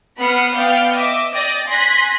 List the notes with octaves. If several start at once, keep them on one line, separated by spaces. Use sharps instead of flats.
B3 F#5 B5 D#6 F6 C7
B3 D5 F5 G5 F6 G6
D#5 E5 D6 E6
D5 D#5 G5 A6 A#6
G#5 C6 F#6 A#6 B6